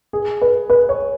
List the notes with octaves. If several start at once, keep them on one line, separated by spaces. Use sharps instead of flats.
G#4
B4
B4
C#5